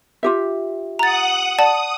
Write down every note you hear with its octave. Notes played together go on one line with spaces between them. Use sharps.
F4 G4 E5
F#5 A#5 D#6 F#6 A6
D5 F#5 A5 D#6